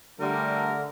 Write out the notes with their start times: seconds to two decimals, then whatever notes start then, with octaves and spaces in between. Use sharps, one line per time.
0.20 D3 G3 A3 A#4